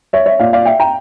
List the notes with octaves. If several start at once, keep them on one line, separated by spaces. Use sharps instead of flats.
C#5 E5
C#5 E5
A#2 D5 F5
D5 F5
E5 G5
G5 A#5